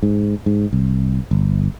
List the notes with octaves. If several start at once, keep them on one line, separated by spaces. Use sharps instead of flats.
G#2
G#2
C2
G1